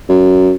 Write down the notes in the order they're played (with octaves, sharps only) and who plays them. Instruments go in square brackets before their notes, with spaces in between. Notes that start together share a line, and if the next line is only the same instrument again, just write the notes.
[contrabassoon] F#2